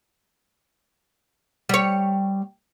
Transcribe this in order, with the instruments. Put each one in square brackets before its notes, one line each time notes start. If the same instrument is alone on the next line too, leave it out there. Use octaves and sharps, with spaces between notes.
[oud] G3 C#5